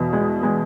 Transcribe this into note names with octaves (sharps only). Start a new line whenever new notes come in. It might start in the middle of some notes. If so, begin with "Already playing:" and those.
Already playing: E2 B2
G#3
G#3